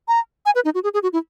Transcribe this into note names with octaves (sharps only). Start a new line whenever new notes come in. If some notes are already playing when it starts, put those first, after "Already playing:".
A#5
G#5
B4
D#4
F#4
G#4
G#4
F#4
E4